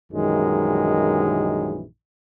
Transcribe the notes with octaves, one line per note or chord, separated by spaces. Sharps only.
A#1 F#2 D#3 E3 G3 G#3